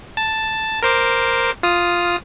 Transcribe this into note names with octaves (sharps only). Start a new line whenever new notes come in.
A5
A#4 C5 D6
F4 D#6 F6